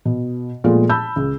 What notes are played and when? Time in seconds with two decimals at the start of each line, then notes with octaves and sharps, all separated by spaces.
0.05 B2
0.64 A#2 F3 G#3 A3 B3 F4
0.90 A5 B5 E6 G6
1.16 C#2